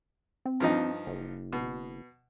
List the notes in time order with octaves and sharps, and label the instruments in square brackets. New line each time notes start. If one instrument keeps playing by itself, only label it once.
[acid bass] C4
[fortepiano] G2 F3 D#4
[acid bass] F#1
[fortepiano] B2